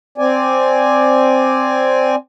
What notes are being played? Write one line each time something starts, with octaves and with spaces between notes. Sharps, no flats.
C4 D5 G#5